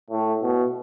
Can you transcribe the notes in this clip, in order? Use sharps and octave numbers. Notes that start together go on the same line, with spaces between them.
A2
B2